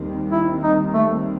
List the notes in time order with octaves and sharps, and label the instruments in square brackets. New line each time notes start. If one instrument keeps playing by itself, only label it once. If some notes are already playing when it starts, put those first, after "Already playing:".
Already playing: [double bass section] D#2 D#3 G3 C4
[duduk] E4
D#4
A3